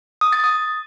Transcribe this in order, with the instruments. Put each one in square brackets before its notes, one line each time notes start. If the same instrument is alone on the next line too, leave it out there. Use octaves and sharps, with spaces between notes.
[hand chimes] D#6
A6
D#6